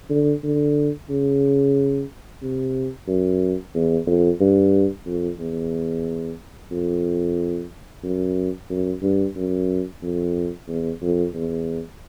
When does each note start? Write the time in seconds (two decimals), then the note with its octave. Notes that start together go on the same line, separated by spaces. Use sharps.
0.10 D3
0.43 D3
1.10 C#3
2.42 C3
3.08 F#2
3.74 E2
4.07 F2
4.40 G2
5.06 F2
5.39 E2
6.71 F2
8.03 F#2
8.70 F#2
9.03 G2
9.36 F#2
10.02 F2
10.68 E2
11.02 F2
11.34 E2